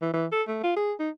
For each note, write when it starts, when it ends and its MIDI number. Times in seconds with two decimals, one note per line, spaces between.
0.02 0.10 52
0.14 0.26 52
0.32 0.43 69
0.48 0.61 57
0.64 0.73 65
0.76 0.93 68
0.99 1.10 63